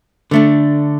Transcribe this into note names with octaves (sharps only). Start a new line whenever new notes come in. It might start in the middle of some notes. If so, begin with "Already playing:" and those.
D3 A3 D4